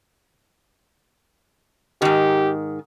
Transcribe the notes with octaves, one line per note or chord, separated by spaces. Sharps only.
G#2 D#3 G4